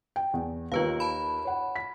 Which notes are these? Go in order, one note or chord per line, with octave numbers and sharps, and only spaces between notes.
G5
E2
D#2 D#3 F4 B4 F5
A5 B5
C#5 F#5
B6